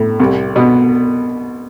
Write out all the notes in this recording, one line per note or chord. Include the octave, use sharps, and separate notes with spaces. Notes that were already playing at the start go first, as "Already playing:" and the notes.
Already playing: A2
C2
B2